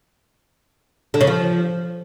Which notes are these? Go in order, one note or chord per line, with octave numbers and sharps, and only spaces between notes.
D3
C#3
F3